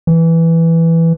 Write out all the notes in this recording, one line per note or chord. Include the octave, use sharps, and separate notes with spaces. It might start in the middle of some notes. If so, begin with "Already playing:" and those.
E3